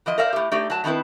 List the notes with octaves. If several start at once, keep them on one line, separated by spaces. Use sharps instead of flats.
E3 F3 D#5
A#4 C5 D5 E5 F5
A2 G4
A3 D#4 G4 D5
F#3 A5
D#3 B3 C4 E4 B4